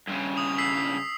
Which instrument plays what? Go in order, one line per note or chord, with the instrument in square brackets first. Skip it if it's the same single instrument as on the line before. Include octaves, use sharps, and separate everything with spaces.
[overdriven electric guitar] G2 C#3
[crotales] D#6 F7
E6 B6 C7